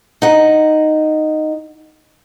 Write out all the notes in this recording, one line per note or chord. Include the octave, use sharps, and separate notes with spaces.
D#4 F#5